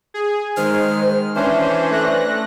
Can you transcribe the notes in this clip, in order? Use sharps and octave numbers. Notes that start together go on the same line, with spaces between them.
G#4
D#3 G#3 C5 F6
E3 C#4 D4 C5 E5
A3 F#6 A#6